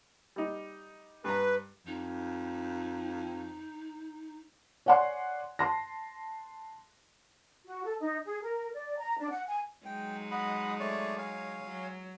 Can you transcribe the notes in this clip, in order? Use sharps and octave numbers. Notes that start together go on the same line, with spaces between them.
G3 D#4
G2 B4 A#5
F2 D#4
C#5 D5 F#5 G#5 C6
A5 C6 A#6
F#4
A4
D#4
G#4
A#4
D5
A#5
D4
F#5
G#5
F#3 G#3 D#4 G5
D#5 F#5 B5
A3 C#5 D5
C#5 F5 G#5
F#3